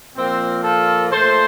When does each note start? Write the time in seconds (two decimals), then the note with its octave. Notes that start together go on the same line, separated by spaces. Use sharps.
0.16 A#2 F3 A#3 C4
0.63 F4 A4
1.11 A#2 A3 A4 C5